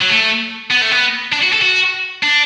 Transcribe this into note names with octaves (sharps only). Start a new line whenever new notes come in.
F#3
A3
B3
A3
B3
D4
F#4
A4
F#4
D4